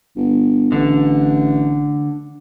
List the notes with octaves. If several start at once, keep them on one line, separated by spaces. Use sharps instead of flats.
G1
A1 D3